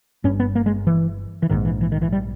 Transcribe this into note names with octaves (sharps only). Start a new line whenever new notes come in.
G1 G2 C#4
B3
A#3
G#3
E3
E3
A#1 G#2 D#3
E3
E3
D#3
E3
G3